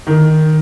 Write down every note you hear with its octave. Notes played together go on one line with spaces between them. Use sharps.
D#3